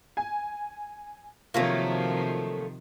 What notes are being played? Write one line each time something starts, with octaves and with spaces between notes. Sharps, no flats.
G#5
C3 D#3 F3 F#3 A3 A#3 F4